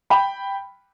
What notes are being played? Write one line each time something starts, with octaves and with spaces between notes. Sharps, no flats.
G5 B5